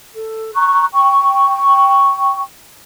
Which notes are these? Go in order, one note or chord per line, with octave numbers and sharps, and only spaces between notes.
A4
A#5 C#6 F#6
G5 C#6